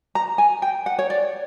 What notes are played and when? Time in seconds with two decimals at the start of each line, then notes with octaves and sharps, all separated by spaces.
0.15 A#5
0.38 G#5
0.62 G5
0.86 F#5
0.99 C#5
1.10 D5